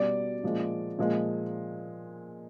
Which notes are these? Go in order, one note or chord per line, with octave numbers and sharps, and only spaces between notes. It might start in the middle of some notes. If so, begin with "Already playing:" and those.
Already playing: B2 G3 D5
A#2 F3 G#3
A#2 F3 G#3